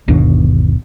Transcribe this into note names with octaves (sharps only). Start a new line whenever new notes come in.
G1 D#2 B2 D4